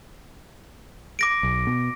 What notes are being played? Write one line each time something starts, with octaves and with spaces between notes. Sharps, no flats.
D6 A#6 D7
B1
B2